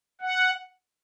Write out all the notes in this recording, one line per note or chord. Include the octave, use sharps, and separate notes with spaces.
F#5